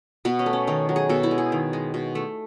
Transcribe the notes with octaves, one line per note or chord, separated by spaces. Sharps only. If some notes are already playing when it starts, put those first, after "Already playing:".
B2 B3
C#4
A3
C#4
D#3 D#4
F#3
G#4
B2 A4
E4
G#3
G#4
D#3
G#3
B2
A3